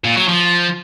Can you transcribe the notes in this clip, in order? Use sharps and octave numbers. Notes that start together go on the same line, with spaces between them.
A#2
F#3
F3